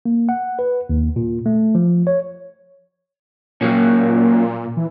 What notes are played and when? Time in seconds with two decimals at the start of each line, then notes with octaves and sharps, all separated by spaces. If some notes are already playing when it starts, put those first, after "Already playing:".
0.05 A#3
0.29 F#5
0.59 B4
0.89 D#2
1.16 A#2
1.46 A3
1.75 F3
2.07 C#5
3.61 A#2 F#3 A#3 C#4
4.77 E3